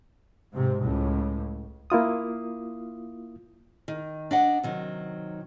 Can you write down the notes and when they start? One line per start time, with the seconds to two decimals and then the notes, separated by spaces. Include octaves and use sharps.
0.52 G#2 C3
0.82 C#2 A2
1.90 A#3 E4 F4 D#6
3.88 D#3
4.31 D4 D#5 F#5
4.63 C3 D#3 F#3